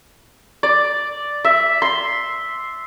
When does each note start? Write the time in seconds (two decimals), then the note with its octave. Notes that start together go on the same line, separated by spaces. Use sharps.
0.63 D5
1.45 E5
1.82 C6